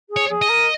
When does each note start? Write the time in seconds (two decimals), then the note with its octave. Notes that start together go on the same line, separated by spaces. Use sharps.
0.10 G#4
0.17 C#5
0.29 G#4
0.42 D#5
0.48 A#4